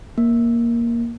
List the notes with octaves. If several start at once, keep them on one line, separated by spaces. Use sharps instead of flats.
A#3